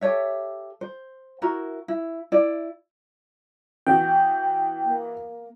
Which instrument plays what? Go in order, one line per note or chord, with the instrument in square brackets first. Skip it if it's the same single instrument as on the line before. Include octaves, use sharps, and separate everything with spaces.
[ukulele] G4 A4 C#5 E5
C5
E4 F#4 A#4
E4
E4 D5
[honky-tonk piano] E3 B3 F#4 [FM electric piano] G5
[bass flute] A#3